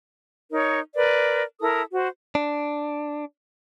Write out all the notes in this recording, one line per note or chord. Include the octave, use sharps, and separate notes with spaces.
D#4 A#4 C#5
A#4 B4 D5
E4 A4 A#4 D#6
F#4 C5
D4